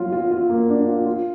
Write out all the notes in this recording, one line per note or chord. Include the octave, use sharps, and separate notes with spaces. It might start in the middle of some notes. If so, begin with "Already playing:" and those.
Already playing: F#3 F4
F4
F4
A#3
D4
F4
F4